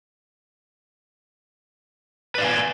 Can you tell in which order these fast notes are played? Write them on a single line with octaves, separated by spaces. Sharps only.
B4 D5 F5 G#5